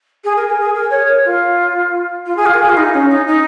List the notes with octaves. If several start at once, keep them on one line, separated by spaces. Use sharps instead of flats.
G#4
A#4
A#4
G#4
A#4
C#5
A#4
F4
F4
G#4
F4
A#4
G#4
F4
D#4
C#4
D#4
D#4